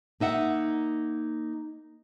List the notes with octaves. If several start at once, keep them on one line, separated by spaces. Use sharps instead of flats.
A#3 D#4 E5 F#5